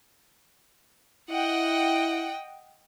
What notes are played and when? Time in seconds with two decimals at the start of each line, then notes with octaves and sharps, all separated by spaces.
1.31 E4 D#5 F#5 G5